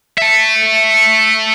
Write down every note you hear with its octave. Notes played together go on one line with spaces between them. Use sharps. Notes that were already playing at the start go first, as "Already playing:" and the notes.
E5 A5